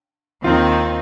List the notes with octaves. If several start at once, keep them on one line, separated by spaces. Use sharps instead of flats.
D#2 D#3 C4 D#4 F4